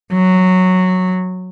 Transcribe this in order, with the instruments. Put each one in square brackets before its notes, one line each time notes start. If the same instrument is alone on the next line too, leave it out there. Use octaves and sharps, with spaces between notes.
[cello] F#3